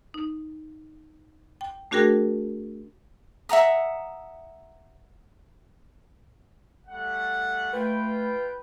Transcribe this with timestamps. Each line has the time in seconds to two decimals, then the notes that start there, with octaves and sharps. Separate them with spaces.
0.14 D#4
1.61 G5
1.91 A3 D4 F#4 G#4 A#4 G5
3.49 E5 F#5 A#5 D#6
6.88 G3 A3 F#5
7.73 A3 F4 B4 G5